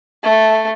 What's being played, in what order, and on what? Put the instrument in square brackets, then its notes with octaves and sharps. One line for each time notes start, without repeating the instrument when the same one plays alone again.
[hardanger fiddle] A3